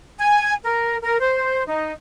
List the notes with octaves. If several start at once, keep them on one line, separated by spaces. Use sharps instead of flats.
G#5
A#4
A#4
C5
D#4